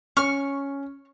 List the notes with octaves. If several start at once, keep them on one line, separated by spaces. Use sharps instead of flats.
C#4 C#6 F6